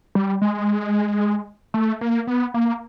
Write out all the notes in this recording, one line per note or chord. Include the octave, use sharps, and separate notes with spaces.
G3
G#3
A3
A#3
B3
A#3